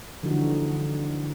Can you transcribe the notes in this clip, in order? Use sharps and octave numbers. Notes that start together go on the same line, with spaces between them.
D3 E3 F3 G3 D#4 F#4